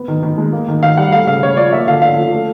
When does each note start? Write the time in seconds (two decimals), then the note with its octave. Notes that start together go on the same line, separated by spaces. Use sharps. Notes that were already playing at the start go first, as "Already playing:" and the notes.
Already playing: B3
0.08 D#3
0.23 D#3
0.38 G#3
0.53 A#3
0.68 D#3
0.82 D#3 F5
0.97 G3 F#5
1.12 A3 F5
1.27 C#3 F5
1.42 C#3 C#5
1.57 F3 D5
1.72 A#3 E5
1.87 D3 F5
2.02 D3 F5
2.17 F3
2.32 A3